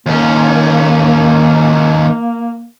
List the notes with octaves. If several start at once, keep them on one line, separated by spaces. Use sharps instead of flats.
D#2 A#3 C#4